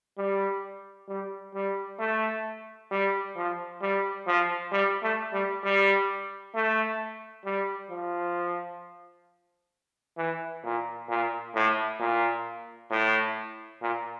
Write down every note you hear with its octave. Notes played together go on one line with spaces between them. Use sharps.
G3
G3
G3
A3
G3
F3
G3
F3
G3
A3
G3
G3
A3
G3
F3
E3
A#2
A#2
A2
A#2
A2
A#2